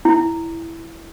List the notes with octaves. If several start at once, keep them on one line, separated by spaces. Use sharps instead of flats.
E4